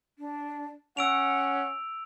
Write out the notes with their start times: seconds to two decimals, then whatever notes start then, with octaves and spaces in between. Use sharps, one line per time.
0.19 D4
0.97 C#4 F#5 E6 D7 F7